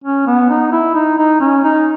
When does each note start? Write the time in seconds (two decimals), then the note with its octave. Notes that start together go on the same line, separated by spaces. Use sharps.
0.04 C#4
0.27 B3
0.50 D#4
0.72 E4
0.95 D#4
1.18 D#4
1.41 C#4
1.64 D#4